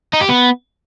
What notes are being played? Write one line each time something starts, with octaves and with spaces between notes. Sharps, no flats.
D#4
G4
B3